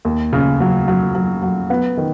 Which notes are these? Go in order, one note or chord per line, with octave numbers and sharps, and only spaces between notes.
D#2
C#3
F#3
F#3
F#3
F#3
B3
D#3